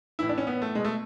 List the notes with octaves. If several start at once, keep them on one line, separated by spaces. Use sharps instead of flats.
A2 E3 E4
D4
C#4
B3
A3
B2 G#3
A3